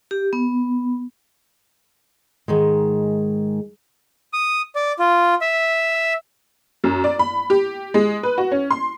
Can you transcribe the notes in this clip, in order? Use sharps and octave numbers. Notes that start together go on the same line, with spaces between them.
G4
B3
G#2 D#3 G#3
D#6
D5
F4
E5
F#2
D5
B5
G4
G#3
B4
F#4
C#4
C6